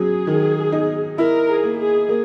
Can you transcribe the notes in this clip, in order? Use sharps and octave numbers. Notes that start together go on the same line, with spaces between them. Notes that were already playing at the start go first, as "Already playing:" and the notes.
Already playing: F#3 C#4 G#4
D#3
D#4
E4 A#4
G#4
A#3
G#4
A#3